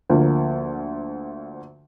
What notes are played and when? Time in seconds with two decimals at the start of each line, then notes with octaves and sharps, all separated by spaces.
0.09 D2 D3 F3 A#3